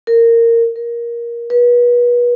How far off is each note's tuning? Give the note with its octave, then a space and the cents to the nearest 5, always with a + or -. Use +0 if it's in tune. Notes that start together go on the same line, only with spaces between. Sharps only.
A#4 -15
A#4 +15
B4 -35